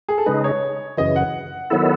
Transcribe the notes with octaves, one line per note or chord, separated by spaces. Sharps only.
G#4
A4
C#3 G#3 D#4 B4
C#5
F#2 C#3 E3 D#5
F#5
D#3 F#3 B3 E4 A4